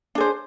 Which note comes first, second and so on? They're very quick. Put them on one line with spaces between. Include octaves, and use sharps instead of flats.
D4 G#4 C5